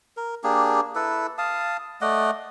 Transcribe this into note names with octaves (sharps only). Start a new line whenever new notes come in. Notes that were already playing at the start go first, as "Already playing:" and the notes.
A#4
A#3 D4 G4 G#4
E4 A4 B4
F5 A5 D#6
A3 D5 D#5 F#5